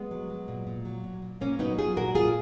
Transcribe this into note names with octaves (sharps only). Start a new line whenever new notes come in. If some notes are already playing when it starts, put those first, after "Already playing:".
Already playing: G#3 B3
F#3
F#3
A#2
A#2
F#3
A#2
A#2
A#2 A#3 C#4
F#3 B3 D#4
F#3 F4 G#4
A#2 F#4 A#4
A#2 F4 G#4